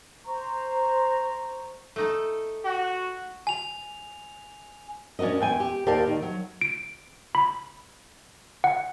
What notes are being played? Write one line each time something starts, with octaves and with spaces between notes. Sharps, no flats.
C5 A#5 C#6
A3 D#4 A4
F#4
G#5 F7
C#4 D4 F#4 A#4 D#5
E2 G5 G#5
G4
D#2 G4 A#4 D5 F5 A5
D#3
F#3
D7
B5
F#5